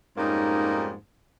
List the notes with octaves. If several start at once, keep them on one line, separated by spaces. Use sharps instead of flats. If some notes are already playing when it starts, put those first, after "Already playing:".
F2 G#2 G3 A#3 C#4 D#4